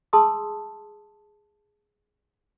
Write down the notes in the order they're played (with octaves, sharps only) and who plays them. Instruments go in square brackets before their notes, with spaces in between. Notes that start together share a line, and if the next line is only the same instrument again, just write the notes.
[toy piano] G#4 A5 C6 D#6 E6